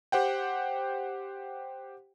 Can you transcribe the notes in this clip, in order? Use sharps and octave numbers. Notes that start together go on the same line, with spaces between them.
G4 C5 F#5 G5